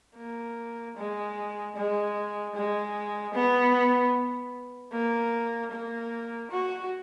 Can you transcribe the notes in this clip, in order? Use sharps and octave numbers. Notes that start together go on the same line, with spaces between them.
A#3
G#3
G#3
G#3
B3
A#3
A#3
F#4